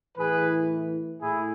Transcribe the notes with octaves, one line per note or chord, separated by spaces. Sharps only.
A2 E3 G#4 B4
A2 E4 G#4